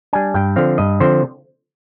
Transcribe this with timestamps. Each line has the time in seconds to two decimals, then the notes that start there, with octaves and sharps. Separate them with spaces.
0.13 G3 D4 G#5
0.34 G2 G5
0.56 D3 F3 C4 F5
0.78 G2 D#5
1.00 D3 F3 C4 C5